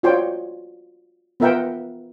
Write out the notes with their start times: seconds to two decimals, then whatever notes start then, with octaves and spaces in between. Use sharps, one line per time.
0.03 D4 F4 F#4 C5 C#5 G5
1.40 B3 F4 A#4 E5 F#5 G5